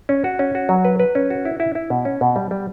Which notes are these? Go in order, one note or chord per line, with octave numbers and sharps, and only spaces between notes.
C#4
F#4
C#4
F#4
F#3
B4
B4
C#4
F#4
E4
E4
E4
B2
C#4
B2
G3
G3